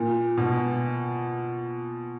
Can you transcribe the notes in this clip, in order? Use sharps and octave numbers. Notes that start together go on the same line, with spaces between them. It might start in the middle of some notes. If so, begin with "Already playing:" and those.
Already playing: A#2
B2